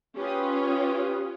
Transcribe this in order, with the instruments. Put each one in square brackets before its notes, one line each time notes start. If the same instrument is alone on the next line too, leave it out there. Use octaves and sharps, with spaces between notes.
[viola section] C#4 F4 [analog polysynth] G4 B4 D#6